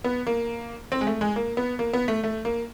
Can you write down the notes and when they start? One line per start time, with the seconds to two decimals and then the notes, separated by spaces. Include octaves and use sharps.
0.04 B3
0.27 A#3
0.92 C4
1.01 G#3
1.07 A3
1.21 G#3
1.36 A#3
1.57 B3
1.79 A#3
1.93 B3
2.08 A3
2.24 A3
2.45 A#3